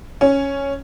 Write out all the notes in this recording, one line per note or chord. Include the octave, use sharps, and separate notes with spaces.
C#4